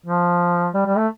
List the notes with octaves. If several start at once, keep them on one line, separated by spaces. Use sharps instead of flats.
F3
G3
G3
A3